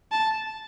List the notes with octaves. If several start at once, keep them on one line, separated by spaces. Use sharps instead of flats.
A5